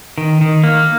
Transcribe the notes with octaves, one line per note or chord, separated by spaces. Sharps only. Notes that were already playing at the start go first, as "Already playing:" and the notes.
D#3
D#3
A#3